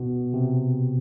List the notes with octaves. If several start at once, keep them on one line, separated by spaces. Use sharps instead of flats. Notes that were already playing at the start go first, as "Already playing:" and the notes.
Already playing: B2
C3